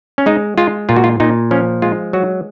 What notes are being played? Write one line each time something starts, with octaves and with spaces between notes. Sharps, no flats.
C#4
G#3 D#4
G#3 F4
A#2 F4
F#4
F4
A#2 D#4
F3 C#4
G#3 F4
F#3 F#4